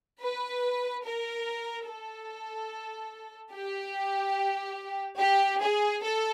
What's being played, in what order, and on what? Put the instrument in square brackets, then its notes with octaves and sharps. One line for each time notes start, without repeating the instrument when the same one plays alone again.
[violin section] B4
A#4
A4
G4
G4
G#4
A4